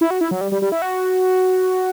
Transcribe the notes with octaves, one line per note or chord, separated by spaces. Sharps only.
E4
F#4
E4
F#3
G3
G3
G3
E4
F#4